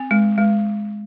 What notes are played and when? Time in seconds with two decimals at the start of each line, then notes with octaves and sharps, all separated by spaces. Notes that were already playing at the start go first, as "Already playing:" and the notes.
Already playing: C4
0.11 G#3
0.38 G#3